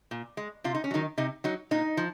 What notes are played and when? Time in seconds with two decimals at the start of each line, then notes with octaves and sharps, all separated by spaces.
0.11 A#2
0.37 G#3
0.64 C3 F4
0.75 D#4
0.84 C#4
0.91 D#3 F#3 D#4
1.18 C3 D#4
1.44 F#3 D#4
1.71 A#2 D#4
1.97 F3